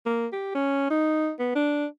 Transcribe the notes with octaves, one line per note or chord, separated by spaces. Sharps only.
A#3
G4
C#4
D#4
B3
D4